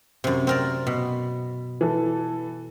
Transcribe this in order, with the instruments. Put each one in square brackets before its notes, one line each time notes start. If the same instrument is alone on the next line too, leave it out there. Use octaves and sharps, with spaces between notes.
[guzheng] F#2 C3
C4 A#4 D5
B2
[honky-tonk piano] E3 A4